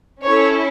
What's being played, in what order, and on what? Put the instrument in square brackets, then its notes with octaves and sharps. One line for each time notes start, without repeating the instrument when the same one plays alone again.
[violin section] C#4 E4 A4 C#5